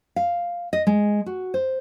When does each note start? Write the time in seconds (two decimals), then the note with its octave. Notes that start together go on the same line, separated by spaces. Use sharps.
0.16 F5
0.73 D#5
0.87 G#3
1.26 F#4
1.54 C5